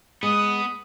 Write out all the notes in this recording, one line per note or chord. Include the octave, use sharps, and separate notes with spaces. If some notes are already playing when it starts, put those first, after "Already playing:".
G#3 B3 D#6